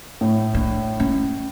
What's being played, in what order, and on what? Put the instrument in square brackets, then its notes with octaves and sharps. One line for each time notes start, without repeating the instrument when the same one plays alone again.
[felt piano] A2
[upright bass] D4
C#4